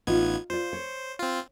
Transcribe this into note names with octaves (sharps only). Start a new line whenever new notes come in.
A1 B3 D#4 F4 G#6
F4 C5 D5
C#5
C4 F4